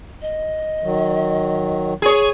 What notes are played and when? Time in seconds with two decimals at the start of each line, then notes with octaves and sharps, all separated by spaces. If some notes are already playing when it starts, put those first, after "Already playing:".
0.22 D#5
0.84 D#3 F#3
2.02 G#4 C#5